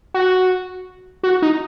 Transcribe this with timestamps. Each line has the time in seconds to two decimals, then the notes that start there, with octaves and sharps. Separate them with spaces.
0.14 F#4
1.23 F#4
1.42 D#4